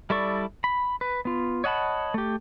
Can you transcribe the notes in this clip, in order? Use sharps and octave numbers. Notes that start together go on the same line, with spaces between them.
G3 E4 A4 D5 C#6
B5
B4
B3 F4
C#5 D#5 F#5 A5 B5
A3 G4